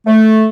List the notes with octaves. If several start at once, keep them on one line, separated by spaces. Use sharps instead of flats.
A3